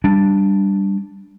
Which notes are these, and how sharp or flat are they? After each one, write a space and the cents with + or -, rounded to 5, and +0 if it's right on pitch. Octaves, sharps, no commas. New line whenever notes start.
G3 +0 D4 +0